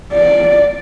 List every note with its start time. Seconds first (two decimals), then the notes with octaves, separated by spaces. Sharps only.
0.13 D5